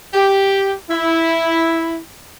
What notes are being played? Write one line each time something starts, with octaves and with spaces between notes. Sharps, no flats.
G4
E4